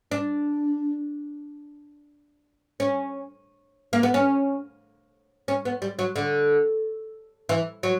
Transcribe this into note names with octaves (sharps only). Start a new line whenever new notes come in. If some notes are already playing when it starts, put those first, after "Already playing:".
D4
C#4
A#3
B3
C#4
C#4
B3
G3
F#3
D3
E3
F#3